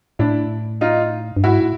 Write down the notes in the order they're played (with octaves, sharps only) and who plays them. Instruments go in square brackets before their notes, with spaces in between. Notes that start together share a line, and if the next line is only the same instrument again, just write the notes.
[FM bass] A2 [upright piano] D4 E4
[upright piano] D#4 F4
[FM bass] G2
[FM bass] G#2 [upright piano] E4 F#4
[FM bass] A2